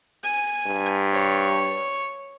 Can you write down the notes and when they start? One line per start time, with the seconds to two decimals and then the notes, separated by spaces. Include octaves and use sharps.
0.24 G#5
0.66 G2
1.13 C#5